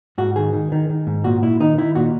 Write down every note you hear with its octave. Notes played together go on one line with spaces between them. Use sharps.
G#2 F#4
D#3 G#4
D#3
D#3
D#3
G#2
A#2 F#4
A#2 E4
D#3 D#4
D#3 E4
A#2 F#4